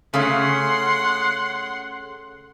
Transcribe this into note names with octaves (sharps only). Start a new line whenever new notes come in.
C#3 A3 C#4 F#5 C6